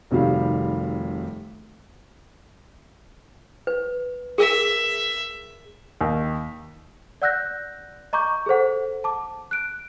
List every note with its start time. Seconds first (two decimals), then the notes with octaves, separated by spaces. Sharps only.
0.11 F1 C3 D#3 F#3 G3 F5
3.67 B4
4.38 G#4 A#4 E5
6.01 D#2
7.22 D5 F#5 E6 F#6 G6 A#6
8.13 D#5 A#5 C#6 D6 G6
8.46 G#4 A4 C5 F#5
9.04 A5 D6
9.51 F#6 D7